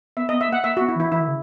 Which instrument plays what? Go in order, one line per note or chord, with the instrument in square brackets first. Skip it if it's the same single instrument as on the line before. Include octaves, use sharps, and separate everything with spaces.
[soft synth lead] B3 [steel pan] E5
[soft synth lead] B3 [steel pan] D#5
[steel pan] E5
[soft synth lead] A#3
[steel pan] F#5
[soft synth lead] A#3 [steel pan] E5
[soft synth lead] B3 [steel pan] F#4
[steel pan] E4
[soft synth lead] E3
[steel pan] E4
[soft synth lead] E3 [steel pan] E4
[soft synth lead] D#3
C#3